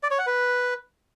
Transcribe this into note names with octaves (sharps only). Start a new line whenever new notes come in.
D5
C#5
F#5
B4